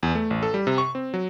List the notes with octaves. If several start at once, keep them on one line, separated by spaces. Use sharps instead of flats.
E2
A3
A1
A4
G3
C3
C#6
C4
F#3